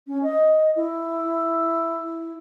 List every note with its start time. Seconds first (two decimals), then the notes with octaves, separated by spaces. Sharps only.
0.07 C#4
0.23 D#5
0.76 E4